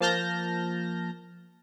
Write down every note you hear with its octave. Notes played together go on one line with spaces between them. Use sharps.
F3 A#3 A5 F6 G6 A#6